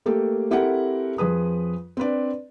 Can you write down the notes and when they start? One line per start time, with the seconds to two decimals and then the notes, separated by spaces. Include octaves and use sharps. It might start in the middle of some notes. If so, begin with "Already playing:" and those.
0.06 A3 A#3 G4 A4
0.51 C4 E4 G4 A4 A#4 F#5
1.18 F2 F3 G#4 B4 D#6
1.97 C4 D4 B4 D5